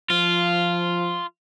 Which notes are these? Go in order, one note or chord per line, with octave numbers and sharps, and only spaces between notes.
F3 F4